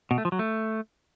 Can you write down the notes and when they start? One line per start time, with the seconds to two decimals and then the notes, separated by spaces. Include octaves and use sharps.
0.11 B2
0.18 A3
0.25 F3
0.32 F#3
0.39 A3